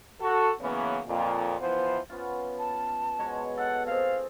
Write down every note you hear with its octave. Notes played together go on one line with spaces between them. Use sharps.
F#4 A4
C#3 E3 F#3 A#3 B3 C#4
F2 A#2
E3 F3 B3 E4 C5
B3 C#4 F4
A5
B2 G#3 C#5
A4 F#5
C4 G#4 F5